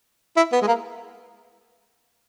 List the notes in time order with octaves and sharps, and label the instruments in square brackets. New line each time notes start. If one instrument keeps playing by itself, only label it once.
[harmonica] E4
B3
G#3
A#3